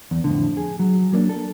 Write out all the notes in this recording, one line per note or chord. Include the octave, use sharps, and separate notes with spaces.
E2
F2 A2 D3
G#4
F#3
F#3 A#3 C#4 D4
A4